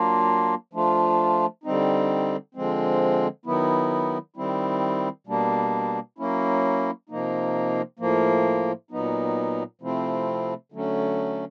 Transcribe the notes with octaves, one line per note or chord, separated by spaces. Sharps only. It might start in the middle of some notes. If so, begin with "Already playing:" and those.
Already playing: F#3 A#3 D4 F4
F3 A3 D4 F4
D3 G3 C4 D#4
D3 F3 G#3 C4
D#3 F#3 B3 E4
D#3 G3 C4 E4
B2 G3 A#3 D4
F#3 A#3 C#4 E4
C3 F3 A#3 D#4
A2 F3 A#3
A#2 F#3 B3 D#4
C3 F3 A3 C4 E4
D3 F#3 A3 C#4